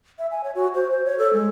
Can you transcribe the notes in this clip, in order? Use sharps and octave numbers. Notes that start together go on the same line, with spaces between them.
E5
G#5
C#5
F#4
C5
C5
C#5
A4
G#3